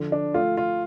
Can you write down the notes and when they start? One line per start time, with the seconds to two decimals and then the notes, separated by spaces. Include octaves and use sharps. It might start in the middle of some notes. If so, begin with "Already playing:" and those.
Already playing: D3 F3
0.12 D4
0.34 A3 F4
0.57 F4